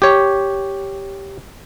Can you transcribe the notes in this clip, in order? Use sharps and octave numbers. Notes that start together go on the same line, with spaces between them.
G4 C#5